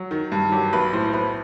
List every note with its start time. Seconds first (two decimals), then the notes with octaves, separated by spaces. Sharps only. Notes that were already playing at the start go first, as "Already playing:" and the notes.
Already playing: F#3
0.11 D#3
0.32 G2
0.52 F#3 G4
0.73 B1 B4
0.93 A2 C5
1.13 B1 B4